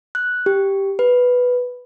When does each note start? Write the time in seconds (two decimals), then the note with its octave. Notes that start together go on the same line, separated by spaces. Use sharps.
0.15 F#6
0.46 G4
0.99 B4